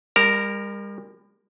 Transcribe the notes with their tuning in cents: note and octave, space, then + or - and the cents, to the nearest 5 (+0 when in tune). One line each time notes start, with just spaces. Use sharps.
G3 +45 A#4 +0 A#5 -35